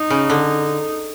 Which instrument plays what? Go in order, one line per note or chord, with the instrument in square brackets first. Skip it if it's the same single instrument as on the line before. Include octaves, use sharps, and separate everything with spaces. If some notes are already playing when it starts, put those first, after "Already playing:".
Already playing: [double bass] D#4
[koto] C#3
D3